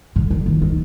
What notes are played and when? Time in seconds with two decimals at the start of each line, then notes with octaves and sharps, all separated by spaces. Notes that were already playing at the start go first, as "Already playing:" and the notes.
0.16 D3
0.31 D3
0.46 D#3
0.62 D#3